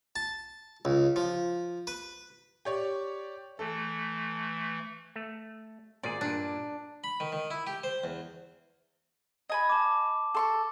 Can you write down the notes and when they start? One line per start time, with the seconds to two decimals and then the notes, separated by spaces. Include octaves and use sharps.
0.16 A5
0.85 C#2
1.16 F3
1.87 B4
2.65 G4 C#5 D5
3.59 E3 A3 A4
5.16 A3
6.03 G#1 A#2 G#4 D5
6.21 G2 A#2 D4
7.04 B5
7.20 D#3
7.32 D#3
7.51 E4
7.67 G4
7.84 C5
8.04 E2
9.49 D#5 G#5 B5
9.70 A5 D6
10.35 A4 C6 C#6